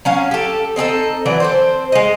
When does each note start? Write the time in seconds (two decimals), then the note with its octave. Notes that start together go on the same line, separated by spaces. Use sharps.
0.05 F#3 C#4 F5
0.31 G4 A4
0.76 C4 D#4 G#4 A4
1.26 E3 F#3 D5
1.40 C4 A4 C5
1.92 G#3 D#5